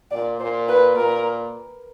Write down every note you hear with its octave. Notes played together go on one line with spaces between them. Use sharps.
A#2 D5
A#2 C5
B4
A#2 A#4